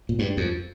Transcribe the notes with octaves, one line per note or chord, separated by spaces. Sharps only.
A#2
G2
F2